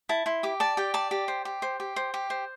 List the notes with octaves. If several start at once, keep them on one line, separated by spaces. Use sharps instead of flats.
E4 A5
E4 C6
G4 D6
D5 A5
G4 G5
D5 A5
G4
C5
G4
C5
G4
C5
G4
C5